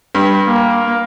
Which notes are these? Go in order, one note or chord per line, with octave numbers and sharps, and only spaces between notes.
G2
A#3